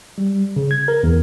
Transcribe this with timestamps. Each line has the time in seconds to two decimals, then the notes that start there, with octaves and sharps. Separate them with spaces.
0.18 G3
0.56 C#3
0.71 G#6
0.88 A#4
1.03 E2